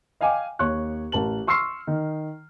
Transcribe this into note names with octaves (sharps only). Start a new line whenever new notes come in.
D#5 F5 G5 G#5 D6
D#2 C#5 C#6 F#6
A1 A#4 A5 F#7
C6 C#6 E6 F6 C7
D#3